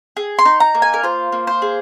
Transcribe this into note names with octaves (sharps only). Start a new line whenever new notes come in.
G#4
C6
D#4
A#5
A#3
G#5
A#4
F4 C5
A#3
C5
G#4